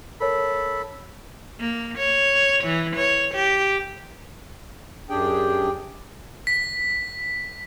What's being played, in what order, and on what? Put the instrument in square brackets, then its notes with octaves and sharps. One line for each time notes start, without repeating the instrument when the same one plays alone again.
[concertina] A4 B5 [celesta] A#4 C#5
[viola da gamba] A#3
C#5
E3
C#5
G4
[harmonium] F#2 D4 G4 G#4 G5
[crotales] B6